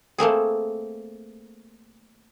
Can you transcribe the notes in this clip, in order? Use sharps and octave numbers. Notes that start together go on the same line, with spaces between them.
A3 A#3 C4 G#4